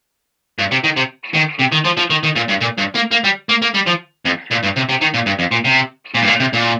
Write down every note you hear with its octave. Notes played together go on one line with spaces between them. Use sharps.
G2
C3
D#3
C3
D#3
C3
D#3
F3
F3
D#3
D#3
A#2
G2
A#2
G2
A#3
A#3
G3
A#3
A#3
G3
F3
F2
A#2
G2
C3
C3
D#3
A#2
G2
F2
A#2
C3
A#2
G2
A#2
C3
A#2